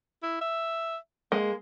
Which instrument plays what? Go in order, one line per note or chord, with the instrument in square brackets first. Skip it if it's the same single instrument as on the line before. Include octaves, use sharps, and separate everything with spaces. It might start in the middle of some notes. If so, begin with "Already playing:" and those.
[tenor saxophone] E4
E5
[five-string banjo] G#3 [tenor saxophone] A#3